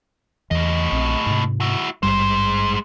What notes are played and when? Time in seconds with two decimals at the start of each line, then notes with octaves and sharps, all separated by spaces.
0.51 E2 A2 E3 D#5
0.92 A#1 C4
1.26 G#2 C3
1.60 E4 F#4
2.03 G#1 G2 G3 G#3 C5